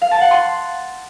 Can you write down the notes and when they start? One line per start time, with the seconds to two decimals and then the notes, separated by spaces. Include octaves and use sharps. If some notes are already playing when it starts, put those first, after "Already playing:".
0.02 F5
0.11 A5
0.21 F#5
0.31 C6